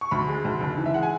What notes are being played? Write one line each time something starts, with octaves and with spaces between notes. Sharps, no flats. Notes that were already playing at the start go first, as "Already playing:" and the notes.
C#6
D2 B5
G#3
D2
F#1
E3
E5
G#3 F#5
G#5